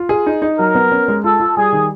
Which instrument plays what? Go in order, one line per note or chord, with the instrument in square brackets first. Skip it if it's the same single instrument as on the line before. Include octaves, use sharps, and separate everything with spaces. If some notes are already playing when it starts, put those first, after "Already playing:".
Already playing: [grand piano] F4
G#4
D#4
D#4
[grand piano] F#3 [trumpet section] A#4
[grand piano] B3
C#4
G#3
[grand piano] F4 [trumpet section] A4
[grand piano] F4
[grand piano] G3 [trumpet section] G#4
[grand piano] D#3